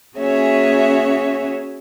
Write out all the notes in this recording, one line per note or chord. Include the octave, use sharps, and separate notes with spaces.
A#3 C#4 F#4 G#4 C#5 E5